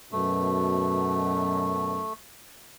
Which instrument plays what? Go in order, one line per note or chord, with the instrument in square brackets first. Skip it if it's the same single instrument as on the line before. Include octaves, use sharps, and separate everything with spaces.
[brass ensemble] F#2 B2 [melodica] A3